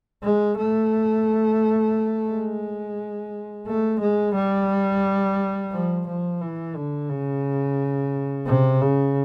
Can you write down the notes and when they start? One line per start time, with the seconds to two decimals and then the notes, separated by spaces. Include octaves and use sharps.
0.23 G#3
0.58 A3
2.29 G#3
3.67 A3
4.00 G#3
4.35 G3
5.72 F3
6.07 F3
6.41 E3
6.75 D3
7.10 C#3
8.47 C3
8.81 C#3